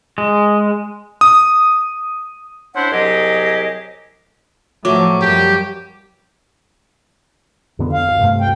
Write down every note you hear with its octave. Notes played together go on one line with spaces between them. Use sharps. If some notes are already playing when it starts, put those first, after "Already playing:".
G#3
D#6
C#4 D4 E4 C5 F#5
C2 F#3 G4 G#4 D#5
A2 F3 F#3 A3 C#6 D6
F#2 F3 G3 G4
F2 D3 B3
F5
E1 F2
G2 C3 A3
D2 G5